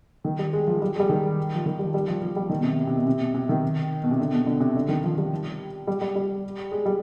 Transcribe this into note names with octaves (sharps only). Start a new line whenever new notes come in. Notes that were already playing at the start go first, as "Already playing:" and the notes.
D#3
G3
G#3
F3
G3
G#3
G3
D#3
F3
D#3
G3
G3
F3
F3
G3
D#3
B2
C3
B2
C3
B2
C3
B2
C3
D#3
B2
C3
D3
B2
D3
C3
D3
D#3
F3
G3
G3
G3
G3
G#3
G3